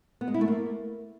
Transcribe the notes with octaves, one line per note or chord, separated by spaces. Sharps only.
B3
G#3
E4
A3
A#3